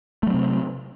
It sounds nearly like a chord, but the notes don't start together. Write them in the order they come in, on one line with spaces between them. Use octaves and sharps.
A3 F#3 C4 C3